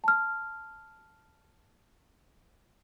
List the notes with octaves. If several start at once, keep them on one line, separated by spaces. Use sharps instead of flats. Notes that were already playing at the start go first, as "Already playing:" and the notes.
A5 F6